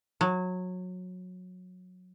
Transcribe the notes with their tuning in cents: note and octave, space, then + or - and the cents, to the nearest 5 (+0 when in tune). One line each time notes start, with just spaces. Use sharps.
F#3 -20